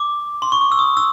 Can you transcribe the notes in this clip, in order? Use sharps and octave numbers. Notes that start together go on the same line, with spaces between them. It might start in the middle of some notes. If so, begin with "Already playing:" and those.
Already playing: D6
C6
C#6
D6
E6
D#6
E6